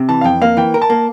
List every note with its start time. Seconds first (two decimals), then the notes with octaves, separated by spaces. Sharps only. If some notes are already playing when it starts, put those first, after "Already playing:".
Already playing: C3
0.09 E3 A5
0.21 F5
0.24 F2 G5
0.42 A#3 F5
0.57 E3 G5
0.74 A#4
0.82 A5
0.90 A#3